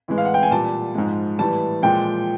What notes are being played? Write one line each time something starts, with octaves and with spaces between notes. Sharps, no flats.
A2 E3 G#3
F5
F#5
G5
G#5
A#2 G3 A5
G#2 F3 G#3
A2 E3 G3 A5
A#2 F3 G#3 G5